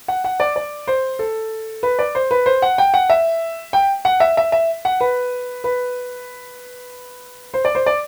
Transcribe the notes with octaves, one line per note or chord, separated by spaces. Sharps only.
F#5
F#5
D5
D5
C5
A4
B4
D5
C5
B4
C5
F#5
G5
F#5
E5
G5
F#5
E5
E5
E5
F#5
B4
B4
C5
D5
C5
D5